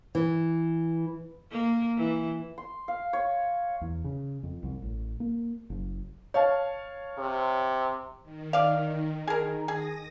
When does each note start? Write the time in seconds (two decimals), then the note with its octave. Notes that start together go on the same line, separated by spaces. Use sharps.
0.15 E3
1.51 A#3
1.98 E3
2.58 C6
2.88 F5
3.13 C#5
3.81 E2
4.04 C#3
4.43 F2
4.63 C2
4.82 A1
5.20 A#3
5.70 F#1
6.34 C#5 F5 A5
7.18 C3
8.23 D#3
8.53 D5 F5
9.27 G#4 A#4
9.68 G#4 D#6 A#6